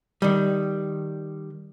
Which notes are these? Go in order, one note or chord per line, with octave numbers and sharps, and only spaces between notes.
D#3 G3